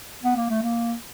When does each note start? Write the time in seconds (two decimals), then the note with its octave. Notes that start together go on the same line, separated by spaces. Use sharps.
0.24 B3
0.36 A#3
0.50 A3
0.63 A#3